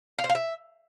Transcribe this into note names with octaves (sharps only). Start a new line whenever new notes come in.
F5
C5
F5
E5